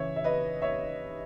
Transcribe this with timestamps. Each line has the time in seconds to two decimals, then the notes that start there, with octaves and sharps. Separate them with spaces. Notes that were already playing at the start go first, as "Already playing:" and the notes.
Already playing: C#3 E3 C#5 E5
0.16 E5
0.24 B4 D#5
0.62 C#5 E5